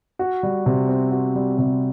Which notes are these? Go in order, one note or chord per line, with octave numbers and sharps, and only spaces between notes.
F#4
G3
C3
C4
F#4
G3
C3